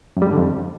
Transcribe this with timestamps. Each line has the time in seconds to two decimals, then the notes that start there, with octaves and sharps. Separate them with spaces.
0.17 F#2
0.22 G3
0.27 G#2
0.32 D3
0.38 F2